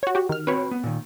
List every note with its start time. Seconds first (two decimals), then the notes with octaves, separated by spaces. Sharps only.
0.03 F#4 C#5
0.15 F#4 G4
0.29 D#3 F6
0.47 C4 F#4 B4 C#5 B5
0.71 B3
0.83 A#2 D#3